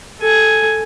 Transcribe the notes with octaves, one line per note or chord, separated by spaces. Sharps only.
A4 G#5